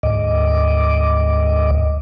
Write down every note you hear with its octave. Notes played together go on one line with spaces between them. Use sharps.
D2 G#2 D#5 D6